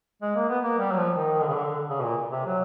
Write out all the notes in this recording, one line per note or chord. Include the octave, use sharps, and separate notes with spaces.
G#3
A#3
B3
A#3
G3
F#3
F3
D#3
D#3
D3
C#3
D3
C#3
B2
A#2
C3
F#3